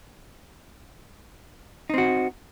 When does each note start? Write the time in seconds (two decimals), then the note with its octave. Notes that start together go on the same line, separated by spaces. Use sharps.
1.90 D#4
1.94 C4
1.98 F#4